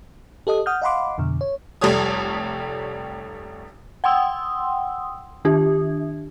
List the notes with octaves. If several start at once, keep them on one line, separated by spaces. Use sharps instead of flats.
G4 A4 D#5 D#6
F#5 D#6 F6 G6
D#5 F5 F#5 B5 C6 D6
F2 B2 D3
C#5
F1 G3 A3 G4 C#5 D#6
F#5 G5 C6 D#6 E6
D#3 D4 G4